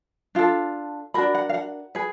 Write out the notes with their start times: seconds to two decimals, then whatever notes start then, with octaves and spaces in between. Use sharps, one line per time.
0.35 D4 F4 A4
1.14 D4 F#4 A#4 B5
1.35 F#5
1.49 F5
1.54 F#5
1.95 G#4 B4